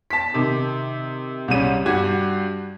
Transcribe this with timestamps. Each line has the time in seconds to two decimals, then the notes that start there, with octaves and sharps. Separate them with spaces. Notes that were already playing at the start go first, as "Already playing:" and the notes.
0.10 A5 B6
0.34 C3 D#3
1.48 C2 C#3 G3 D#7
1.86 G2 G3 F#4 G#6